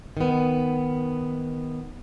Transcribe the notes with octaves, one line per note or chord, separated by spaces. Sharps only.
D#3 B3